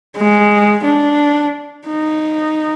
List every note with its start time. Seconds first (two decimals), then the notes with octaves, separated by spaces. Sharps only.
0.17 G#3
0.85 D4
1.87 D#4